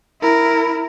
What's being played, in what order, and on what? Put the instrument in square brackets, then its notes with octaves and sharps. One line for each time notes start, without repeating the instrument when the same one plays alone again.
[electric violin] E4 A#4